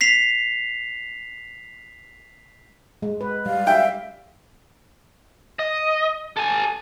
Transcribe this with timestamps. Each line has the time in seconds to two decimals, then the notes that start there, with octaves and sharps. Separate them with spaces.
0.01 B6 C7 F7
3.02 G#3
3.21 B4
3.46 G3 F5
3.67 E5 G5
5.59 D#5
6.37 A4 G#5